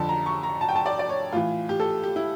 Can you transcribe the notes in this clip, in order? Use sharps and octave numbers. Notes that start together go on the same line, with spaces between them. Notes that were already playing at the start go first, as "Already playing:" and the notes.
Already playing: F2 D3 A5
A#5
C#6
A#5
A5
G5
A5
D5
D5
C#5
A2 E3 F4
G4
A4
G4
E4